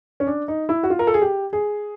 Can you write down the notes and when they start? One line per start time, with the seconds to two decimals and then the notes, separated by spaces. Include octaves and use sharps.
0.20 C#4
0.27 D4
0.48 D#4
0.69 E4
0.83 F#4
0.90 F4
0.99 A#4
1.07 A4
1.14 G#4
1.22 G4
1.53 G#4